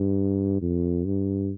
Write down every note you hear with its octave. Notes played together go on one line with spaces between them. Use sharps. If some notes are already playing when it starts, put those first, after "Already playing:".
Already playing: G2
F2
G2